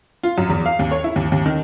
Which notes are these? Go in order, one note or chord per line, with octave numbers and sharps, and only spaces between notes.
F4
F#2
E2
F5
D#2
C#5
E4
D#2
D#2
D#3